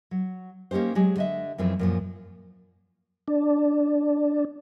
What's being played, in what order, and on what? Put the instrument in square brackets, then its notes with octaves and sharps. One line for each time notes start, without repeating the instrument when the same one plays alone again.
[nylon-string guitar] F#3
A#3 C#4 D#4 G4 C5
F#3 G#3 G4 G#4
D3 D#5 E5
F#2 E3 F3 A3 C4
F#2 A#2 F3
[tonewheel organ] D4